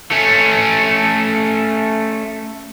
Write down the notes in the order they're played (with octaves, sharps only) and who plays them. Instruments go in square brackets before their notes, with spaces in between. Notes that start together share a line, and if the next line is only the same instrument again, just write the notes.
[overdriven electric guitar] A3 C#4